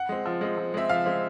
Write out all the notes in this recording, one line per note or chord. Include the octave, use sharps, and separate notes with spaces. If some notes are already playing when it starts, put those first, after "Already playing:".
Already playing: F#5
G#3 C4
F3
G#3 C4
F3
G#3 C4 E5
F3 F5
G#3 C4